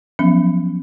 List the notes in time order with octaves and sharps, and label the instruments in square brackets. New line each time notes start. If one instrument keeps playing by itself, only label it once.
[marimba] F3 F#3 B3 C#4